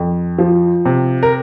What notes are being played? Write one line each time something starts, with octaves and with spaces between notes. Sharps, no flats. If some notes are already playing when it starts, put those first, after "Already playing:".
Already playing: F2
F3
C3
A#4